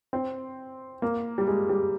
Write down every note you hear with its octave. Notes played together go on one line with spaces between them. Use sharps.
C4
A#3
G3
G#3
G3